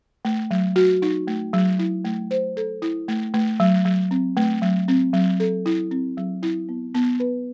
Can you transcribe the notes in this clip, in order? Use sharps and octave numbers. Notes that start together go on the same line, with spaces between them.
A3
F#3
F#4
D#4
A3
F#3
E4
A3
C5
A4
E4
A3
A3
F#3
F#3
C4
A3
F#3
C4
F#3
A4
E4
C4
F#3
E4
B3
B3
B4